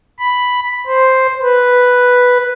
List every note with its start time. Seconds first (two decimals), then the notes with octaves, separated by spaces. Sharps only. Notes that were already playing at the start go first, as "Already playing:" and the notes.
0.19 B5
0.86 C5
1.42 B4